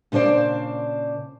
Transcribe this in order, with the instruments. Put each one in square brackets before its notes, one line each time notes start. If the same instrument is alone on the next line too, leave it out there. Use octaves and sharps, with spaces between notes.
[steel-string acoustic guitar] A#2 C#3 D4 C5 D5